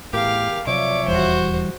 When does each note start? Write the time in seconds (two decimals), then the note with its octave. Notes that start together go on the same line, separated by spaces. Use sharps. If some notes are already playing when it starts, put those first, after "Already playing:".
0.13 E2 A2 G4 A#4 F5
0.67 C3 F3 F#3 C#5 D5 E5 D6
1.08 D#1 E2 E3 G3 F#4 C5